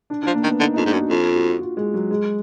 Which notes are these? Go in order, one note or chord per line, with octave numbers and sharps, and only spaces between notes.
D4
F3 D4
A#3
D#3
B3
D3 D#4
F2 D#4
G#2 D4
F#2
F#4
F2 F4
F#4
F4
G#3
F#3
G#3